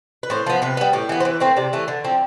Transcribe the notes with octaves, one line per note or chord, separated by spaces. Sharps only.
B4
A2 C5
F3 B3
C3 B4
G3 B3
A2 G4
E3 B3
C5
E3 B4
A3 C4 C5
C3 D5
E3 A3
D3
F3 C4